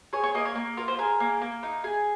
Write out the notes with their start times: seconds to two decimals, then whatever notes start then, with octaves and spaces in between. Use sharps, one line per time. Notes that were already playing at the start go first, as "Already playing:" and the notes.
0.13 G#4 C#5
0.23 C#5
0.35 A#3 D#5
0.45 C#5
0.56 A#3
0.77 F4 A#4
0.88 C5
0.99 G#4 A#4
1.20 A#3
1.42 A#3
1.63 D#4
1.84 G#4